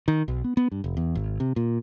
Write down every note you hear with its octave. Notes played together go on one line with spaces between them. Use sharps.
D#3
B1
B3
B3
G2
F1
E2
G#1
C3
A#2